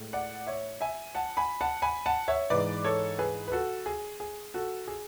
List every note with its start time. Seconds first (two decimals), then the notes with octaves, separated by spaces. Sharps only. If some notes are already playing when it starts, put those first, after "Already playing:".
Already playing: A2 G#3
0.13 D5 F#5
0.47 C#5 E5
0.81 E5 G#5
1.15 F#5 A5
1.37 G#5 B5
1.61 F#5 A5
1.82 G#5 B5
2.06 F#5 A5
2.28 C#5 E5
2.50 G#2 E3 G#3 B4 D5
2.84 A4 C#5
3.19 G#4 B4
3.48 B4
3.52 F#4 A4
3.86 G#4
4.20 G#4
4.54 F#4 A4
4.88 G#4